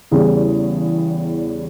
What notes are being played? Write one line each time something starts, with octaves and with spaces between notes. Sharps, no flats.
E2 C#3 G3 B3 G#4